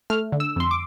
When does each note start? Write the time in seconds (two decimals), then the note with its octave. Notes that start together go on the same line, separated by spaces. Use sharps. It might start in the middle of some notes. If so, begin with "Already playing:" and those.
0.10 A3 F6
0.32 D3
0.40 E6
0.56 F2 C6
0.71 D6